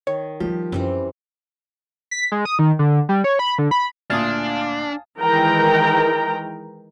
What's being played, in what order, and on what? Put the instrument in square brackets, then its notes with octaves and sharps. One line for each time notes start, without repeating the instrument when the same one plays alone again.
[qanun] D#3 [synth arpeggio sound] C#5
[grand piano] F3 [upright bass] G3 G#3 [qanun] G4
[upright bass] F#2 [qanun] E3 G3 C4
[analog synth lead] B6
G#3
D#6
D#3
D3
G3
C#5
B5
D3
B5
[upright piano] D2 A#2 D#6 [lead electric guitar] D4 [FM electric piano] F5 G#5 A5
[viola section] D#3 E3 G#3 A#4 G5 A#5